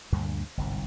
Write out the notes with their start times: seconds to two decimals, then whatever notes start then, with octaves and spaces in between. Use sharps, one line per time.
0.12 D2 G2 A#2 D3
0.57 G1 C2 G#2